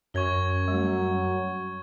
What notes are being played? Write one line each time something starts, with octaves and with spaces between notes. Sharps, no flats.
F#2 F#4 C#5 C#6 G#6 G7
F#3 G3 A3